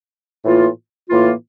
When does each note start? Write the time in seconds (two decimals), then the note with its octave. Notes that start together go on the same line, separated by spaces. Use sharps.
0.44 A2 E3 A#3 F4
1.08 A2 E3 A#3 F4